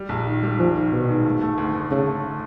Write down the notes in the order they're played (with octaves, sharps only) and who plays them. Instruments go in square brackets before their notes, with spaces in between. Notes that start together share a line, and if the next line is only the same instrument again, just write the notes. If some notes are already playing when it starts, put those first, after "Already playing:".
Already playing: [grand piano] G3
A#1
D#3
G3
[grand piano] A#1 [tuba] F3
[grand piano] D#3
[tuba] B2 [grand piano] D#3
[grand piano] G#2
A3
A3
D2
D2
[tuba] C#3 [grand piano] A3
[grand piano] A3